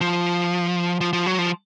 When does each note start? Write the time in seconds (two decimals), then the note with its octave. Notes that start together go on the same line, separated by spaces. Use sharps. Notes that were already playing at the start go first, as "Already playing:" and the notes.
0.01 F3
1.01 F3
1.13 F3
1.26 F#3
1.38 F3